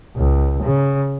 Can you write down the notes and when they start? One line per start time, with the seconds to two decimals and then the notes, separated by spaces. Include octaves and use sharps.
0.16 C#2
0.63 C#3